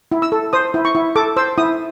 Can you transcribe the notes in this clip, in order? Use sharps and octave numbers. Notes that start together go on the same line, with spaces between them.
E4
E6
A4
C5 D#6
E4
C#6
E4
A4 D6
C5 E6
E4 D#6